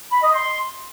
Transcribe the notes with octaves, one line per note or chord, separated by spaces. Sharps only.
B5
D#5
C6